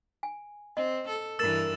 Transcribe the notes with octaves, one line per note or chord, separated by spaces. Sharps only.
G#5
C4 D#5
A4
G2 E3 A#4 E6 A6 E7